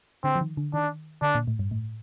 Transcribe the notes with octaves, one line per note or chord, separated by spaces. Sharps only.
D3 C4
F3
D#3
D3
D#3 D4
D3 D4
A#2
A2
G2
A2